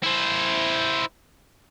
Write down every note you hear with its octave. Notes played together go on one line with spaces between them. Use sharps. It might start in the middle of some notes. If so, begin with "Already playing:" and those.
E4 C5